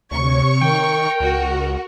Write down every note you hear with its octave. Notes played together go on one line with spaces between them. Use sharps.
D2 C3 C#5 C#6
D#3 A#4 G5
C#2 F#4